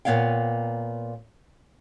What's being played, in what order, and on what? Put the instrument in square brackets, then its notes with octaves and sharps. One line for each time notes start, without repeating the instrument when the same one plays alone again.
[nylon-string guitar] A#2 B3 C#5 F5 G5